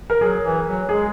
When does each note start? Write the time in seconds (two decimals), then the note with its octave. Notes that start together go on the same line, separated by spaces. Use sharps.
0.10 A#4
0.21 F#3 G#4
0.44 E3
0.67 F#3
0.89 G#3 G#4